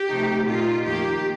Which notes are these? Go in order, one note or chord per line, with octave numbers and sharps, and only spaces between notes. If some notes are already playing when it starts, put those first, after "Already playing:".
Already playing: G4
C3 F3 A3 D#4
A#2 A3 D#4 F4
F2 D#3 A#3 G4